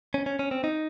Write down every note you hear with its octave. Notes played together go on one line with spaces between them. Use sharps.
C#4
C#4
C#4
C4
D#4